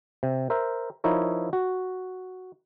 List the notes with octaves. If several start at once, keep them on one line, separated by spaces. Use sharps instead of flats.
C3
A#4 C5 E5
F3 D#4 E4 A#4 C#5
F#4